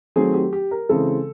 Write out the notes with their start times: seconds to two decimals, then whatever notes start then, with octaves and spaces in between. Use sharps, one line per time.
0.16 D#3 F#3 A3 C4 G#4
0.34 G4
0.53 G4
0.71 A#4
0.89 C#3 E3 G#3 C4 A4